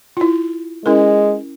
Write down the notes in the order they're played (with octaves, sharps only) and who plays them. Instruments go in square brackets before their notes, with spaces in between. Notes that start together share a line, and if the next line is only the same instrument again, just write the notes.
[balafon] E4 F4
[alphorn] G#3 [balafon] C#4 E4 A#4